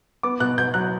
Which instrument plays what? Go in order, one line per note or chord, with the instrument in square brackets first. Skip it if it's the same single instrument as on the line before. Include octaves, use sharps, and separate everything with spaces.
[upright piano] B3 D6
B2 F#6
B2 G6
F#3 F#6